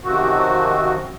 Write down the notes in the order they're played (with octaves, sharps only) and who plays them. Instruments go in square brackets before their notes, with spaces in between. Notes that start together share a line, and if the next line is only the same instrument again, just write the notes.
[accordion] F#2 C3 D#3 F3 C4 F#4